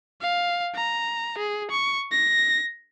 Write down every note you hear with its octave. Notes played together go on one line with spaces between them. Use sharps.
F5
A#5
G#4
C#6
A#6